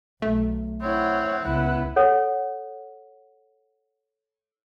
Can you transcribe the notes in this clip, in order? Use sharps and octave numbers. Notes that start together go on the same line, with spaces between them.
B1 A3
C4 E4 C#5 F#5
C#2 B3 E4 B4 F#5
A4 C#5 F#5